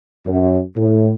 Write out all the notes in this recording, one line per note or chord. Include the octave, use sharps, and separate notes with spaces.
F#2
A2